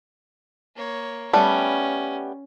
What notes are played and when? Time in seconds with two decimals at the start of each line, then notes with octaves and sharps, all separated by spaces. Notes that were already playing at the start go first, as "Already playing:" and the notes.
0.76 A#3 C#5
1.33 G3 A3 B3 C#4